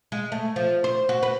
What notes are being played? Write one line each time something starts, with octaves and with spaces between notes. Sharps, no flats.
G#3
A3
F3
C5
F#4
B4